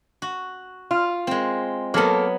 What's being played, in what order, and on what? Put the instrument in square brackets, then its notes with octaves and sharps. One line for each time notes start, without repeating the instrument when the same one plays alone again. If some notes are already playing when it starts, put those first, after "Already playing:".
[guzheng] F#4
[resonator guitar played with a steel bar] F4
[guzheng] G#3 C4
[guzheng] F#3 B3 [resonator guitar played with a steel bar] A#3 A4